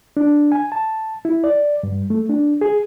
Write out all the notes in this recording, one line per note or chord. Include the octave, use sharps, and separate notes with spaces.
D4
G#5
A5
E4
D5
G2
A3
D4
G#4